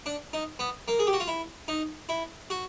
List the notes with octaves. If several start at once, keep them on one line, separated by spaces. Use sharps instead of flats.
D4
D#4
B3
A#3
G#4
G4
F#4
F4
E4
D#4
E4
F#4